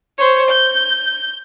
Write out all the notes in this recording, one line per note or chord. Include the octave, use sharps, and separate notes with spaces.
C5 C#5
G6